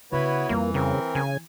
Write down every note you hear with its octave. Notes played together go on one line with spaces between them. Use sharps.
C#3 B3 E4 F#4 B4 C#5
F2 E3 G3 A#3
C#3 C4 A#4
C#3 E3 G#5